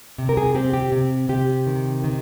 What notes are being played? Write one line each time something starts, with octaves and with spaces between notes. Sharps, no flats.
C3
A#4
G#4
C4 G4
G4
C3
C3 G4
D#3
D#3